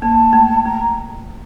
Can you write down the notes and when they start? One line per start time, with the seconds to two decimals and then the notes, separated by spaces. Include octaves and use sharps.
0.02 A#3 A5
0.33 A3
0.66 A3 A#5